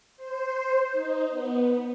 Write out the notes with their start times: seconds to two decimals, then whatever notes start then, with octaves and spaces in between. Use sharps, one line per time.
0.16 C5
0.92 D#4
1.30 B3